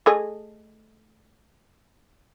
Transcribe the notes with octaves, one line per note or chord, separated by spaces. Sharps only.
A3 G#4 D#5